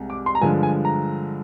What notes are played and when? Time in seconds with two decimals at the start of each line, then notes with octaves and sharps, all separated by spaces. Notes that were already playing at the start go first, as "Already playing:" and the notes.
Already playing: C2 C3 G#3
0.10 D6
0.26 C6
0.35 A#5
0.41 G2 D3 F3 G#3 G#5
0.63 G#5
0.85 A#5